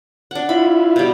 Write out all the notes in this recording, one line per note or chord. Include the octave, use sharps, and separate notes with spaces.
D4 F#5
E4 F4 B5
B2 G3